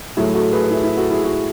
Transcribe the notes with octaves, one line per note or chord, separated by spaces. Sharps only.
A2 F#3 A3 E4 G#4
F#4 A4
G#4 B4
E4 G#4
E4
F#4 A4
E4 G#4
F#4